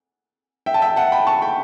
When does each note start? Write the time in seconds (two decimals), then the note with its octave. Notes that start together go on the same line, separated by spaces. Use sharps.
0.66 E5 G5
0.74 A5
0.82 E5 G5
0.96 F#5 A5
1.12 G5 B5
1.27 A5 C#6
1.42 G5 B5